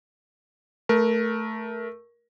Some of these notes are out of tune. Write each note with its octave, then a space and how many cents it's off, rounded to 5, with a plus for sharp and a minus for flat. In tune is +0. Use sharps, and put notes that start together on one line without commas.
A3 +0 A#4 +20